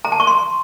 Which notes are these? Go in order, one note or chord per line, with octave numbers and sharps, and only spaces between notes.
A#5
A5
C#6
C6